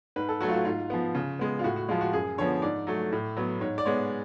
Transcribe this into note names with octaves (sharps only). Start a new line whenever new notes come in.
G#2 B4
A4
F#3 A3 F#4
F4
F#4
G#2 F4
F3 B3
C#3
G#3 B3
F4
A2 F#4
F#4
F3 G#3 F4
F#4
F#2 G#4
D3 F3 B3 C#5
G#2 D5
F#3 A3
A2
F#3 B3
G#2 C#5
D5
G#3 B3 C#5